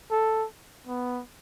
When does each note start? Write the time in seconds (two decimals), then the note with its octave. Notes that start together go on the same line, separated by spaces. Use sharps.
0.11 A4
0.87 B3